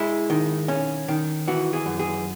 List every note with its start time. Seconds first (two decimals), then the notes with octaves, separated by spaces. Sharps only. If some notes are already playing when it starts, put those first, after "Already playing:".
Already playing: G#3 E4
0.30 D#3
0.68 C#4
1.08 D#3
1.48 E3 F#4
1.73 G#4
1.86 F#2
2.00 G#4